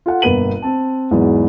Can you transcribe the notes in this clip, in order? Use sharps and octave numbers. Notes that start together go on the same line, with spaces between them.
F4 A4 F#5
G1 B2 A#3 B4 D#7 F#7
C4 A5
E2 G#2 E3 F#3